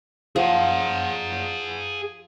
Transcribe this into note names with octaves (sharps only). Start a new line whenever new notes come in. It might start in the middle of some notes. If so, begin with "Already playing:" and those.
F3 G#4 F#5